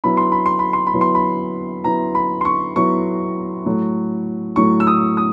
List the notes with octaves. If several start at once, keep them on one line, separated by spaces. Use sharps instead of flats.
F#3 B3 E4 B5
C6
B5
C6
B5
C6
B5
F#3 B3 E4
C6
B5
F#3 B3 E4 A#5
B5
C6
C#6
F#3 B3 E4 C#6
A2 F#3 A3
A2 F#3 A3 C#6
E6
D#6
D#6